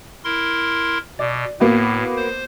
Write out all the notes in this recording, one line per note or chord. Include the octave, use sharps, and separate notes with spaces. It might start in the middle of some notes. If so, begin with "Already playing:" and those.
E4 A#4 C6
B2 D5
A2 A#3 B3 F#4
C5